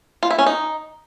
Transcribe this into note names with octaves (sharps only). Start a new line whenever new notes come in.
F4
E4
C#4
D#4